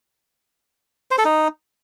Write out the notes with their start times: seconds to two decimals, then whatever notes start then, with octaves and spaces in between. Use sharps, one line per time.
1.11 C5
1.18 A4
1.25 D#4